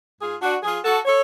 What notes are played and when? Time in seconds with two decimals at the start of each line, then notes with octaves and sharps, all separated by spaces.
0.20 G#2 F4 G#4
0.41 D4 F#4
0.63 F3 F4 G#4
0.84 F#4 A4
1.05 A4 C#5